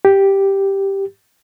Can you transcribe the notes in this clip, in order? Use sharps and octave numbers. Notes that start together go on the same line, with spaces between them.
G4